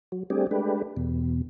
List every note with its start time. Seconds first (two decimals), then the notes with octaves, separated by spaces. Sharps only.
0.12 F#3
0.30 G3 A3 C4 D4 G4 G#4
0.51 G#3 A3 D4 G4 B4
0.97 E2 B2